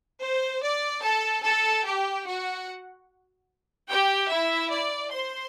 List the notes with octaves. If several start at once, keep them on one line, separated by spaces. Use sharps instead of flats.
C5
D5
A4 A5
A4 A5
G4 G5
F#4 F#5
G4 G5
E4 E5
D5
C5 C6